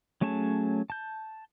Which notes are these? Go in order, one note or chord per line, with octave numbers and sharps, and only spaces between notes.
F#3 A3 C#4 G#4 A5
A5 G6